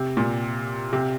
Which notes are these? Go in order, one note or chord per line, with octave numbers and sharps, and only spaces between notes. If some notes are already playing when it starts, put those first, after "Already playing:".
Already playing: C3
A#2
C3